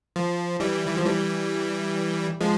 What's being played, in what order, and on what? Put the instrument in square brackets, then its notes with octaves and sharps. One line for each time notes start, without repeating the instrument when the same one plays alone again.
[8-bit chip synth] F3
E3 G3
E3
F3
E3 G3
F3 G#3